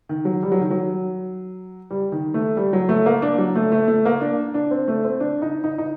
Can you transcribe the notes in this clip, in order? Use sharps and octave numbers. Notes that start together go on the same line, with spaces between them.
D#3
F#3
G3
F#3
D#3
F#3
G3
D#3
A3
G3
F#3
A3
A#3
D4
F#3
A3
A3
A3
A#3
D4
D4
C4
A3
C4
D4
D#4
D#4
D#4